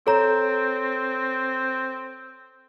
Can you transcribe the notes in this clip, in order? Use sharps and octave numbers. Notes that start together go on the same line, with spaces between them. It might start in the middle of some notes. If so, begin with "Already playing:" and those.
C4 A4 C#5 A#5